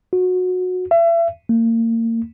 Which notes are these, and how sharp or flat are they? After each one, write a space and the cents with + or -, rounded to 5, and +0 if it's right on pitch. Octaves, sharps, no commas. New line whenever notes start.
F#4 -20
E5 +35
A#3 -35